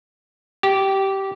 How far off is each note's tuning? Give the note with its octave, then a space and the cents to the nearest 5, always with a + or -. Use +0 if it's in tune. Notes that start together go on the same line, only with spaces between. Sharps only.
G4 -15